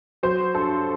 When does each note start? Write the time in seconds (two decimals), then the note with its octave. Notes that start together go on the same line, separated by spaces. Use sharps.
0.23 F#3 C5
0.54 G2 A4